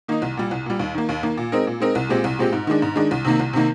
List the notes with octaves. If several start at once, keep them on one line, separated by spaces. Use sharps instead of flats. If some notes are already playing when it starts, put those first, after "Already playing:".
D#3 A#3 D#4
C2
A#2 G3
C2
A#2 G3
D#2
D#3 A#3
D#2
D#3 A#3
A#2
G#3 C4 D#4 A#4
A#2
G#3 C4 D#4 A#4
C2
A#2 G#3 C4 G4
C2
A#2 G#3 C4 G4
G#2
D#3 G#3 D4
G#2
D#3 G#3 D4
C2
C3 D#3 A#3
C2
C3 D#3 A#3